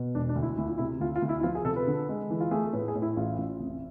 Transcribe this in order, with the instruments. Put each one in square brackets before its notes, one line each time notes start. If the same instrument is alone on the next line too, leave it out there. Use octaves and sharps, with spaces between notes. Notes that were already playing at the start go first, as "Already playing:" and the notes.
Already playing: [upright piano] B2
E1 D4
D4
D2
E4
D2 E4
F4
C3 E4
D2 F4
F4
D2
E4
E4
F3 F4
G#4
C3 A4
B4
D3
G#3
E3
F4
A3 G#4
A4
A2 B4
G#4
A2
E4
A1 F4
A1
F1